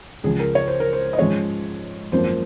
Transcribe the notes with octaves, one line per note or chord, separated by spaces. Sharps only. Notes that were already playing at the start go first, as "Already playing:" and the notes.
C#2 C#3 F3 G#4
A#4
C#5
C5
A#4
C5
D#5
G#2 F3 G#3 C#4 C#5
G#1 F#2 F3 A#3 C5